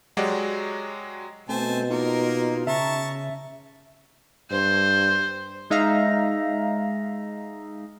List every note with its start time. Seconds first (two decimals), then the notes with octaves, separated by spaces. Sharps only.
0.17 F#3 G#3 F#4 G4 D5
1.49 B2 A3 C4 C5 G#5 A5
1.90 A#3 D#4 F4 A#4
2.67 C#3 E5 A5 A#5 C#6
4.51 G2 C5
5.70 G#3 D#4 E5 F5 A#5